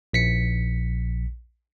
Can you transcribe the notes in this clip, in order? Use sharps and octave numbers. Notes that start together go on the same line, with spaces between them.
A#1 B6 C#7